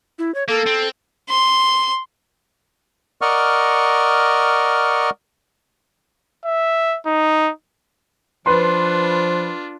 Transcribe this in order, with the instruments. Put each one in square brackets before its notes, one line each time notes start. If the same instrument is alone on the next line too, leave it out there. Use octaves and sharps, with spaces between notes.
[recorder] E4
C#5
[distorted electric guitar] A#3 [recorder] A4
[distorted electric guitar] C4
[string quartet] C6
[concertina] A#4 D5 D#5 F#5 C#6 F6
[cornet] E5
D#4
[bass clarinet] F3 [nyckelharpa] D4 F4 [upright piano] B4 C6